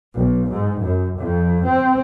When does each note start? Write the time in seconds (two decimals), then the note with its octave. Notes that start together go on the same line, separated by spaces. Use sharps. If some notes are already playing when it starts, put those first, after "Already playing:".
0.16 B1
0.51 G#2
0.81 F#2
1.18 F2
1.65 C4